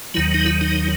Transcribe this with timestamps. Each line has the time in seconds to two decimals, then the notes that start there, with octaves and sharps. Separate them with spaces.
0.14 D#2 D#3 F#3 E4
0.34 D#4
0.46 E4
0.61 D#4